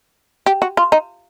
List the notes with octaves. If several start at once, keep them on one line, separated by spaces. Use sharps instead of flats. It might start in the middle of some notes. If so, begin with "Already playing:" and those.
G4
F#4
F4
D#4